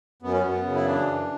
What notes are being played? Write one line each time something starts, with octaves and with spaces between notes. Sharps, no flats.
F#2 B3
C#4
F#2 B3
C#3
E4
E3 D4
F#2